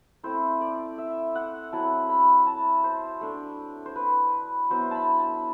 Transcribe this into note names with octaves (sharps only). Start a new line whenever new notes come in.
A3 C4 E4 C5
D5
E5
F#5
F#3 C4 E4 A5
B5
A5
C5
A3 D4
C5
B4
F#3 B3 E4 C5
A5 B5
A5